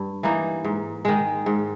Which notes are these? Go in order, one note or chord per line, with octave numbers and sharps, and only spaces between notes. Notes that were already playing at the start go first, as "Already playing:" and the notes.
Already playing: G2
E3 A#3 D#4
G#2
D#3 G#3
G#2